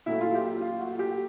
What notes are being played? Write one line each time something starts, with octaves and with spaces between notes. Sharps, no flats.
A#2 F#3 A3 E4
F4
G4
F4
F#4
G4